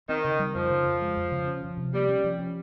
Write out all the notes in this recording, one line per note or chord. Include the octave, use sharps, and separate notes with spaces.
D#3 C4
C#3
G3
F2 F3
C#3
F2
G#3
F2
C#3
C#4
F3
C3
G3 A#3
C#4
F3
C#4